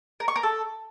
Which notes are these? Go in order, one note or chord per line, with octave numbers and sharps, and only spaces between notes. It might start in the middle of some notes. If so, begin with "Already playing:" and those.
A#4
C#6
A#4
A4